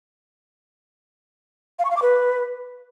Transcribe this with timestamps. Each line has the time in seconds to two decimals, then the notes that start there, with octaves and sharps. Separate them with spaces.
1.79 F5
1.85 C#6
1.91 F5
1.96 D6
2.02 B4